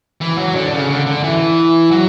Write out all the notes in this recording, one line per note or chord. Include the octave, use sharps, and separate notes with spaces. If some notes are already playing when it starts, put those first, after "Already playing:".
E3
F#3
D3
C#3
D3
D3
E3
F#3